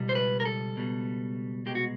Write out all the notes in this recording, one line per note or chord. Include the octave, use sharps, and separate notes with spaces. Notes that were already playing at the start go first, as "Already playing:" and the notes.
Already playing: C#2 B2 G3
C5
B4
A#4
A4
C#2 B2 G3
C2 B2 G#3 G4
F#4